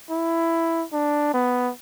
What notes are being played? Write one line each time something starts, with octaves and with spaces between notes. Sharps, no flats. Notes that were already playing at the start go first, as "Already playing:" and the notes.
E4
D4
B3